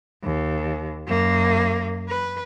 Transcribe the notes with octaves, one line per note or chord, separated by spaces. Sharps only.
D#2
F#2 A#3
B4